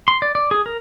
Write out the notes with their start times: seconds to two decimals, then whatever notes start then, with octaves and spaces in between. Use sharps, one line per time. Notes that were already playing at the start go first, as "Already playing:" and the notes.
0.08 C6
0.22 D5
0.35 D5
0.51 G#4
0.66 A#4